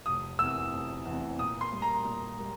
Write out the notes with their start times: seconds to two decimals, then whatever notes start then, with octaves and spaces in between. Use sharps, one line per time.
0.06 F1 D#6
0.39 E2 C3 E3 E6
0.73 F1
1.05 E2 C3 E3
1.39 A#2 D#6
1.61 C6
1.71 G3 A#3
1.82 A#5
2.05 A#2
2.38 G3 A#3